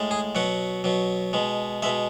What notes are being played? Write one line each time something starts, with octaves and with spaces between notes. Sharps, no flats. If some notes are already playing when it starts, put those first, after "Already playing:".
Already playing: A2 G#3
G#4
B2 F#3 F#5
B2 F#3
B2 G#3
B2 G#3 E5